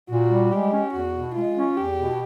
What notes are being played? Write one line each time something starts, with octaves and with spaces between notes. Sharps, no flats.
A#2 F#4
G3
G#3 G4
C#4
E2 F#4
B2
G#3 F4
C#4
E2 G4
B2